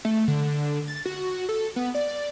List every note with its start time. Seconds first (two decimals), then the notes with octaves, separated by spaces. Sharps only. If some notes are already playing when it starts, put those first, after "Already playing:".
0.05 A3
0.28 D3
0.88 A6
1.06 F#4
1.49 A4
1.76 B3
1.95 D5